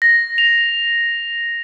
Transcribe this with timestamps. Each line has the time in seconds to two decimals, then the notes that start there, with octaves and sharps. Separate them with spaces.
0.02 A#6
0.38 F7